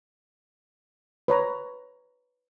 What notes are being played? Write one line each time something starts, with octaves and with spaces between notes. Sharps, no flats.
B4 C#5 A#5